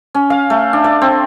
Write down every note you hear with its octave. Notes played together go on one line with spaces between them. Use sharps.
C#4
F5
A3
D4
D5
C4